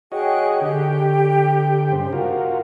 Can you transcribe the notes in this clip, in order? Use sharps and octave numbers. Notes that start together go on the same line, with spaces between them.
F#4 G#4 C#5 D#5 G5 F#6
D3 G4 G5
G2 C#3 C5
F4 F#4 A#4